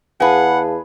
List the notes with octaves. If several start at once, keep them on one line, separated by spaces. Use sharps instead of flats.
E2 G#4 B4 F5 F#5 A5